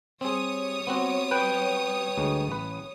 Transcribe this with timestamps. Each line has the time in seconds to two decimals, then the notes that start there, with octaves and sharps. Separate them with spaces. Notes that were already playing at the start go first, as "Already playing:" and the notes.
0.21 G3 C4 G#4 C#5 D#6
0.87 B3 C4 F#4
1.31 B4 G5
2.17 D2 G#3
2.48 A1 B4